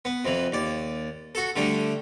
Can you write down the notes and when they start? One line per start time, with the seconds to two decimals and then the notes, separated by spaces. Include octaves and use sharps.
0.05 B3
0.25 F2 E3
0.52 D#2 D5
1.35 F#4 A4
1.56 D3 G3 A3 D4